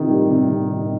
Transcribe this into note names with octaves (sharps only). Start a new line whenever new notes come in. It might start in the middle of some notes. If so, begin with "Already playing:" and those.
Already playing: C3 D#3
G3
C3
C3
D#3